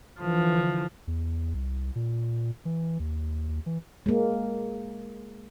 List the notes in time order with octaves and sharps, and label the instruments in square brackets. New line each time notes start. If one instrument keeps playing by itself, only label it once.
[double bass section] D3 E3 [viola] F3
[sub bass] E2
C2
A#2
E3
D#2
D#2
E3
[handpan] G#3 A#3